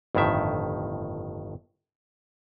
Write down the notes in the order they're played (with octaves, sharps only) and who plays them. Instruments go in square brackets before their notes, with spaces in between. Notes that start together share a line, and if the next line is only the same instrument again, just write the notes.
[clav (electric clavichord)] G1 F2 A2 D#3 E5